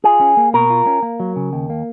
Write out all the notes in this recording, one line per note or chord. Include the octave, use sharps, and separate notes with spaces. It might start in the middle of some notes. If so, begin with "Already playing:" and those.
F4 G#4
C#4
A#3
B2 A#4
F4
C#4
A#3
F#3
C#3
D#2
A#3